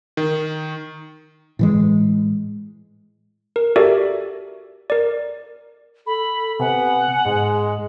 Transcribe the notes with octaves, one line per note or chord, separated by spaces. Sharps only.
D#3
A2 E3 G#3
A#4
F#4 G4 A4 A#4 D5 E5
A#4 D5
A4 B5
C3 B3 F#5 G#5
G#2 G#3